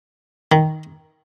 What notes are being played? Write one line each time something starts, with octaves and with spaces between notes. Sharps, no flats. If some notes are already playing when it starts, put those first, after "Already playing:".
D#3